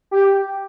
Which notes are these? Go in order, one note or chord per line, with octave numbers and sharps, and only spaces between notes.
G4